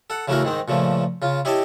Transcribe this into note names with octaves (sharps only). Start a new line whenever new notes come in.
A4 F#5
C#3 E3 A3 E4 F#4 A#4
G#2 D#3 C4 D#4
A#2 C#3 F3 A3
C#3 F4
E4 G4 C#5 D#5 G5 A5